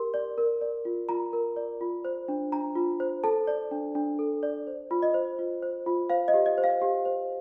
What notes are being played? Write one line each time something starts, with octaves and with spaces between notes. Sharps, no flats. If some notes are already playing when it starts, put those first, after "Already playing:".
Already playing: G4 A#4 C6
D5
A#4
D5
F4
F4 A#5
A#4
D5
F4
C5
D4
D4 A#5
F4
C5
A4 A5
D5
D4
D4
A4
D5
C5
F4
D#5
C5
F4
C5
F4
C5 F5
D#5
G4
D#5
C5
F5
G4
C5